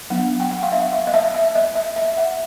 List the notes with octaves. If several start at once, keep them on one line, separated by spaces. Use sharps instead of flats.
F#3 B3 D4 F#5
G5
F#5
F5
E5
F5
D#5
E5
E5
D#5
E5
E5
F#5